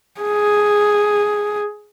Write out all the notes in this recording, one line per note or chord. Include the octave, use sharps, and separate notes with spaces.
G#4